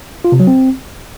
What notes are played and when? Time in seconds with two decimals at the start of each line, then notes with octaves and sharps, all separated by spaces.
0.25 F4
0.32 C3
0.40 F#3
0.47 C4